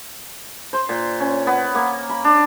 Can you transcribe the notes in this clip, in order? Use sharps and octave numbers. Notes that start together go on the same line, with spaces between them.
C5
A#2
C#4
B3
A#3
B5
D4